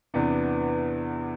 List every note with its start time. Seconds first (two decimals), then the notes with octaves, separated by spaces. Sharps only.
0.14 E2 C3 E3 B3 D4